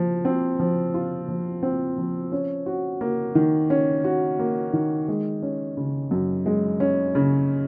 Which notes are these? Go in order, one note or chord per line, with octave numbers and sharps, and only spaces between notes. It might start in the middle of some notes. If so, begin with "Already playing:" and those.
Already playing: F3
C4
F3
F4
F3
C4
F3
C#4
F#4
A#3
D#3
C#4
F#4
A#3
D#3
G#3
C#4
C#3
F#2
G#3
C#4
C#3